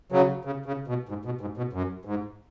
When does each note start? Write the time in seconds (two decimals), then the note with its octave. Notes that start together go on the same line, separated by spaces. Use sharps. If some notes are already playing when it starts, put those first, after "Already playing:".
0.12 C#3 F#3
0.45 C#3
0.66 C#3
0.87 B2
1.09 G#2
1.25 B2
1.41 G#2
1.57 B2
1.73 F#2
2.05 G#2